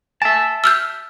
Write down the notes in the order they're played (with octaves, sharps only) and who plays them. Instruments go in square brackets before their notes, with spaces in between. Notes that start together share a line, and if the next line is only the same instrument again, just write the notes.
[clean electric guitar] E5 A5 [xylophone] G#5
[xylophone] E6 F6 G6